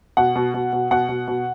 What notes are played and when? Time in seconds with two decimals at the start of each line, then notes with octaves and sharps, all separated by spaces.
0.17 B2 F#5
0.36 B2
0.54 B2
0.73 B2
0.91 B2 F#5
1.09 B2
1.28 B2